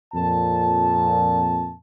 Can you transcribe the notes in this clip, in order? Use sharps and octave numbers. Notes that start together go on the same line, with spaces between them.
F2 A#2 A5